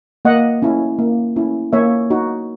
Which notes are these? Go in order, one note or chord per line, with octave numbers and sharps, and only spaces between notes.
A#3 D#5 F#5
C#4 E4
A#3
C#4 E4
A#3 C#5 E5
D#4 F#4